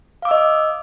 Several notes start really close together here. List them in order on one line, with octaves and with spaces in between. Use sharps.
F5 D6 E6 D#5